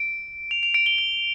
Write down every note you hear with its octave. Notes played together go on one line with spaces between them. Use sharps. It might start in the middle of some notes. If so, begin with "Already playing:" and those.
Already playing: D7
F7
F7
D7
G7
G7